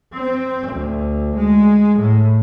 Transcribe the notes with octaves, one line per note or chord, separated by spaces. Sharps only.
C4
D2
G#3
A2